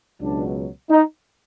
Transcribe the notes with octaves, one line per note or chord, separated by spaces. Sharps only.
C#2 B2 F#3 D4
D#4